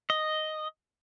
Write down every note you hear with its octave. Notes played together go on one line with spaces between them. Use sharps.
D#5